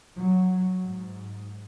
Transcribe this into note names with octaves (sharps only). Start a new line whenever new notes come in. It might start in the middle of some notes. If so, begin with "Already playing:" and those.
F#3
G#2